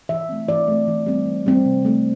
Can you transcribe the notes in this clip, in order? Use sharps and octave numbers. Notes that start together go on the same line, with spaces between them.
E3 E5
A3 C4
E3 D5
A3 C4
E3
G3 C4
E3
G3 C4
C3
A3 C4